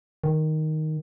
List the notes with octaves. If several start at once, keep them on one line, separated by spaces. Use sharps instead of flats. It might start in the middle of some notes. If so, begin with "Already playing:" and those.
D#3